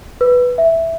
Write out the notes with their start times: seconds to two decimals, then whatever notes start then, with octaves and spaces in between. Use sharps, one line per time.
0.21 B4
0.58 E5